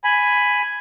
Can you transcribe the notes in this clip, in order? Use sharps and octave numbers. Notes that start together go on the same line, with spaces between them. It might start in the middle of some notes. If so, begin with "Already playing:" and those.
G#5 B5